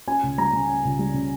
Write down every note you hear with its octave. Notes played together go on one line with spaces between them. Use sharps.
C#4 G#5
C#2
G3 A#5
C#3
C#4
C#2
G3
C#3